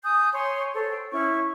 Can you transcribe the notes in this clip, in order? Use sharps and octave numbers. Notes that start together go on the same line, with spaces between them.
G#5 D#6 G6
C#5 G#5 C6
A4 C5 C#5
G5
C#4 E4 C#6